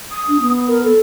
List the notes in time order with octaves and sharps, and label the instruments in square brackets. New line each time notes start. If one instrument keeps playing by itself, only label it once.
[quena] D#6
[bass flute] D4
B3
[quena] A#4
A4